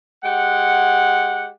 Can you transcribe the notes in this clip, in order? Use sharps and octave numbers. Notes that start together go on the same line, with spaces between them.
G#3 G4 F#5